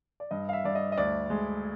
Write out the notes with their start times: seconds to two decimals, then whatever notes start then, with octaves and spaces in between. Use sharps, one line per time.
0.20 D5
0.31 G2 D#5
0.49 F5
0.53 E5
0.64 G2 D5
0.75 D#5
0.92 D#5
0.97 D2 D5
1.30 G#3